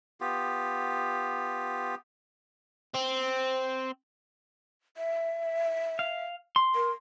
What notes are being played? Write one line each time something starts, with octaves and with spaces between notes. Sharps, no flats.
B3 F4 G4
C4
E5
F5
C6
A#4